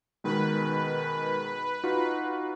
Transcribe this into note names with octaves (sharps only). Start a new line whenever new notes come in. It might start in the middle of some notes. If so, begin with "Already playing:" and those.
B2 D#3 G#3 B4
D#4 F4 F#4